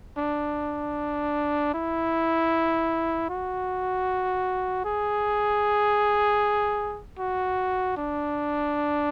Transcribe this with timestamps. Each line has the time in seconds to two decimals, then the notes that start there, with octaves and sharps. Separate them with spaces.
0.18 D4
1.74 E4
3.30 F#4
4.85 G#4
7.19 F#4
7.97 D4